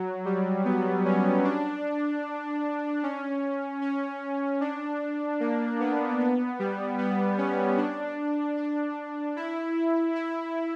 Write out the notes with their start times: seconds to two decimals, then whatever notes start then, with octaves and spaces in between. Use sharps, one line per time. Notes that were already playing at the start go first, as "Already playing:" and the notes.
Already playing: F#3
0.25 G3
0.65 B3
1.05 C#4
1.44 D4
3.03 C#4
3.82 C#4
4.61 D4
5.40 A#3
5.80 B3
6.20 B3
6.59 G3
6.98 B3
7.38 C#4
7.77 D4
8.57 D4
9.36 E4
10.15 E4